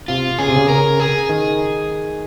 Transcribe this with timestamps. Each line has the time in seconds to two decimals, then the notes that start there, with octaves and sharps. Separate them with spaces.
0.08 C3 F4
0.39 C#3 G#4
0.48 C3
0.56 C#3
0.69 A#4
1.00 G#4
1.30 D#3